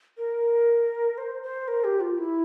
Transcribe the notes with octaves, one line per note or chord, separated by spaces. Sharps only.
A#4
C5
C5
A#4
G4
F4
E4